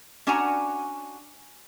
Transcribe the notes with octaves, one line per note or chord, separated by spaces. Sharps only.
C#4 D4 F#4 F#5 G#5 A#5